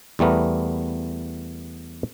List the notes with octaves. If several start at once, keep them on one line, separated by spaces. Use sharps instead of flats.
E2 G3 A3 B3 A#4